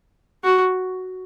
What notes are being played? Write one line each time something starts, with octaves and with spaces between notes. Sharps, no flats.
F#4